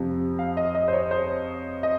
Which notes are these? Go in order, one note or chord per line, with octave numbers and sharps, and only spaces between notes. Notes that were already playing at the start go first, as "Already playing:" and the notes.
Already playing: F2 C3 F3
F5
D#5
D#5
C5
C#5
C5
D#5